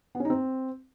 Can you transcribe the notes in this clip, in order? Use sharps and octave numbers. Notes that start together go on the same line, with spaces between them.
B3
C#4
D#4
C4